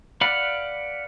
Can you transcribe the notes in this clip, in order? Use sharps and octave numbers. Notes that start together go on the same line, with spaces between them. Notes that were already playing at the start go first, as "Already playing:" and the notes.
B4 D5 F5 F#5 B5